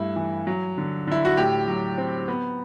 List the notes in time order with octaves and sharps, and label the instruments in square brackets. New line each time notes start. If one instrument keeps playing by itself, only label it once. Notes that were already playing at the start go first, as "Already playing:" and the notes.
Already playing: [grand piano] G2 A3 E4
E3
F#3
D3
D3 E4
F#4
A2 G4
F#3
C4
B3